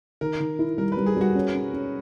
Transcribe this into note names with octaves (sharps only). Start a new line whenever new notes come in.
D#3 A#4
D#3
E4
G3 A#4
B4
G3
G#4
G3 F#4
C#4
C#4
C#4